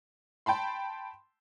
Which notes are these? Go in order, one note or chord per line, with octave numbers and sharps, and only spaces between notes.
G5 A5 B5 C6